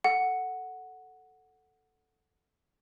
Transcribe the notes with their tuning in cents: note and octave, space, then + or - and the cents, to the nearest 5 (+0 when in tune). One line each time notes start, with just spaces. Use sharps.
A4 +0 F#5 +0